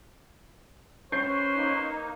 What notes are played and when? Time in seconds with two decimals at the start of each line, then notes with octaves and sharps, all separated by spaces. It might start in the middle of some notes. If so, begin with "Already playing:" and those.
1.12 C#4 B4 C5 G6 C7
1.55 A#3 D#4